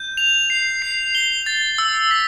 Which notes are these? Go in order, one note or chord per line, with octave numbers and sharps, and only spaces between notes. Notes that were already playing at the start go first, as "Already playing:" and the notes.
Already playing: G6
F7
C7
C7
G7
A6
E6
B6